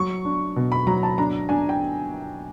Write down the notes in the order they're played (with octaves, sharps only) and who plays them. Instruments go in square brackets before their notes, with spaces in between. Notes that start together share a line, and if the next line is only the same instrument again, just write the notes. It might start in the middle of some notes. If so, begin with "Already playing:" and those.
Already playing: [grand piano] F#3 [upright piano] C#6
[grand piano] D4
B2
[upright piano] B5
[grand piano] F#3 [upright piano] A#5
[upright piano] A5
[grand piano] D4 [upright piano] A#5
[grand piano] D4 [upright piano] G#5
[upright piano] G5